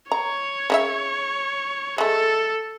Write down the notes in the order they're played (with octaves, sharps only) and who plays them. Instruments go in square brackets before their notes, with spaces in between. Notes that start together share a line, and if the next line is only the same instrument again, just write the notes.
[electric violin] C#5 [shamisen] A#5
[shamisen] C#3 F#4 E5
[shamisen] G#3 A3 [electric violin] A4